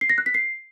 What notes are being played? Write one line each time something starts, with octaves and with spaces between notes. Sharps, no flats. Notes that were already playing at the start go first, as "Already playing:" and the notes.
C7
A#6
F#6
B6
C7